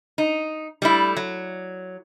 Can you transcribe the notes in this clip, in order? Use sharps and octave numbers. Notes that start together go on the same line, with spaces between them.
D#4
G3 A3 E4
F#3